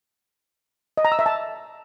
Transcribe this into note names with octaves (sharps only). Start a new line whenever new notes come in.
D#5
A#5
E6
E5
A5